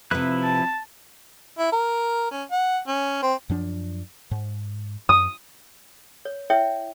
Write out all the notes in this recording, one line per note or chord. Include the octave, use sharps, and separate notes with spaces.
C3 F3 E4 B4 F#6
A5
E4
A#4
C#4
F#5
C#4
C4
F#2 F3 D4
G#2
F#2 D#6
C#5
E4 C#5 E5 G5